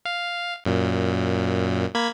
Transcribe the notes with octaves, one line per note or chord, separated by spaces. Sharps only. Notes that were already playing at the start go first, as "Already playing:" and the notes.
F5
F#2 A#2
A#3 B5 G#6